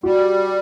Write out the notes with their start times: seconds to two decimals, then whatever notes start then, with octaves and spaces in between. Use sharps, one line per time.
0.03 G3 F#4